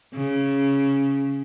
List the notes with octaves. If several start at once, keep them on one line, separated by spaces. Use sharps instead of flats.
C#3